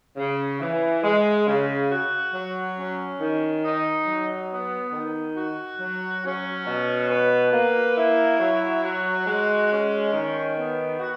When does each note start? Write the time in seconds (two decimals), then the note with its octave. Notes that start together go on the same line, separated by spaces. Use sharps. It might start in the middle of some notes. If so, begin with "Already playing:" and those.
0.17 C#3
0.60 E3
1.03 G#3
1.46 C#3
1.89 F#4
2.34 F#3
2.77 C#4
3.20 D#3
3.63 D#4
4.06 F#3
4.50 B3
4.93 D#3
5.37 F#4
5.80 F#3
6.23 C#4
6.67 B2
7.10 B4
7.52 A#3
7.96 E4
8.39 F#3
8.83 F#4
9.26 G#3
9.70 C#4
10.13 D#3
10.57 B3
11.00 F#4